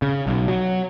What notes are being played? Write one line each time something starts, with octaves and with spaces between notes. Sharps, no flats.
C#3
B1
F#3